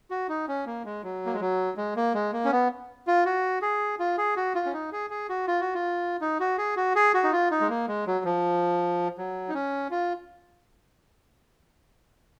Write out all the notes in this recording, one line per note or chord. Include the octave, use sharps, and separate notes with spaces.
F#4
D#4
C#4
A#3
G#3
F#3
A#3
G#3
F#3
G#3
A#3
G#3
A#3
C#4
B3
F4
F#4
G#4
F4
G#4
F#4
F4
C#4
D#4
G#4
G#4
F#4
F4
F#4
F4
D#4
F#4
G#4
F#4
G#4
F#4
D#4
F4
D#4
G#3
A#3
G#3
F#3
F3
F#3
D#4
C#4
F4